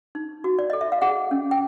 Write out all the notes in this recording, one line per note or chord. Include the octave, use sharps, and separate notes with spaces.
D#4
F#4
D5
A4 D#5
E5
F5
G#4 F#5
C#4
G5